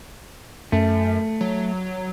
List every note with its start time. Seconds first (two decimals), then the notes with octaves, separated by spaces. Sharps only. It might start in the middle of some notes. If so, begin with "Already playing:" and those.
0.72 F#2 A3
1.41 F#3